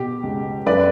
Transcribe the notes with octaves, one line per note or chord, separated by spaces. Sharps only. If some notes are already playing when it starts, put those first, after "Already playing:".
Already playing: B2 G4
C#2
F#2 B4 D5